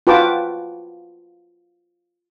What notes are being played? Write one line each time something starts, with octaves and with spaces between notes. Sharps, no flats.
F4 F#4 B4 G5 A5 D6